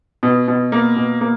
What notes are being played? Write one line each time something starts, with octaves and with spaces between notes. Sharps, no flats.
B2
B2
A#3
B2
A#3